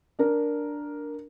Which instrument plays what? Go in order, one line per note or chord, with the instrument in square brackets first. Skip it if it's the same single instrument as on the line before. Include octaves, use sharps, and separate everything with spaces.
[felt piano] D4 A#4